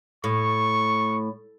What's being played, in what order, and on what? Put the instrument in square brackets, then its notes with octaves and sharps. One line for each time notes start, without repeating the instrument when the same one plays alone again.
[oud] A2 [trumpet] C#6